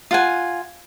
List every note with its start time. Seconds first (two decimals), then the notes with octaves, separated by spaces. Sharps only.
0.11 F4 F#5 G#5